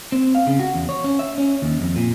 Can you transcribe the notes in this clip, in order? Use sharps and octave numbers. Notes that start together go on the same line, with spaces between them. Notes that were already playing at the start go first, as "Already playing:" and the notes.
C4
F5
C#3
F#4
E2
C#5
C#4
E5
C#4
D#2
F2
A#2